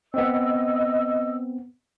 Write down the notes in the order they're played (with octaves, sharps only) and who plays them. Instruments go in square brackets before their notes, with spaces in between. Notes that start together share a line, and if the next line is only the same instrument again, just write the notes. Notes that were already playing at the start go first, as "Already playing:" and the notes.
[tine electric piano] B3 C4 [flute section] D#5 E6